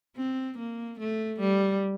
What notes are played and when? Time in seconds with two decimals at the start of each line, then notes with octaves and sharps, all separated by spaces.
0.16 C4
0.58 A#3
0.99 A3
1.39 G3